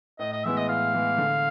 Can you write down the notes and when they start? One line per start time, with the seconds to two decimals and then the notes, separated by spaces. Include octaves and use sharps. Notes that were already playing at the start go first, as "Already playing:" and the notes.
0.19 A2 D#5
0.32 D#5
0.44 E3 G#3 B3 E4 E5
0.57 D#5
0.69 A2 F5
0.94 E3 G#3 B3 E4
1.18 D3